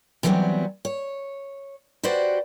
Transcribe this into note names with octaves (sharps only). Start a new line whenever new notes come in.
D3 E3 F#3 G3 B3 C4
C#5
F#4 G4 B4 C5 D5 F#5